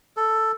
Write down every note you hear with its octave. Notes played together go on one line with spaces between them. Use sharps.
A4